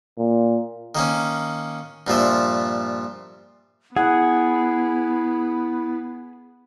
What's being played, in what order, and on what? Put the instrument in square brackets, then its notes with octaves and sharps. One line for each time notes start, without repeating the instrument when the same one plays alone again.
[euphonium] A#2
[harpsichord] D#3 A#3 C#4
G2 A#2 F3 E5
[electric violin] B3 [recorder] E4 [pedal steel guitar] G#4 [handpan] F#5